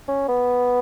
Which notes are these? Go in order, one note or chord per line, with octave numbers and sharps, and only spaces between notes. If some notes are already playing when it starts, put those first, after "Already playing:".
C#4
B3